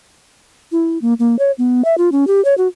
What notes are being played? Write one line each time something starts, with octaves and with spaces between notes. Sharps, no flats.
E4
A#3
A#3
C#5
B3
E5
F4
C#4
G4
C#5
F#4